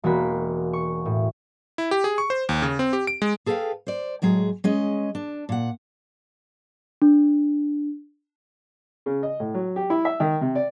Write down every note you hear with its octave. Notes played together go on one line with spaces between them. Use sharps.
E1 A#3 F#4 B5
C#6
A2
E4
G4
G#4
C#6
C5
D#2
C#3
C4
G4
D7
G#3
G#4 A4 B4 C#5 F5 G5
C5 D5
A2 F#3 G#3 G#4
G#3 C#4 D#5
D4
A#2 F#5
D4
C#3
D#5
A2
F#3
G4
E4
E5
D#3
C3
D5